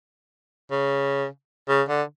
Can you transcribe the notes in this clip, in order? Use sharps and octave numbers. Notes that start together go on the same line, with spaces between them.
C#3
C#3
D3